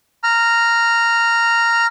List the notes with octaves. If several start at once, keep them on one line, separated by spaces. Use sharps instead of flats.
A#5 F6